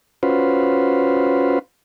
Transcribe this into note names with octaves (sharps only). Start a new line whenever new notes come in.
C#4 F4 F#4 B4 C5